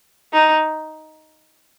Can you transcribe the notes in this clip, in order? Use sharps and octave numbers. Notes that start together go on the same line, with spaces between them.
D#4